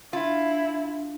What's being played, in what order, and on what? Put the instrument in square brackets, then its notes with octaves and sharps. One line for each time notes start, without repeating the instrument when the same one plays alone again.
[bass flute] D4 [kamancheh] E4 [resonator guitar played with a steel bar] F4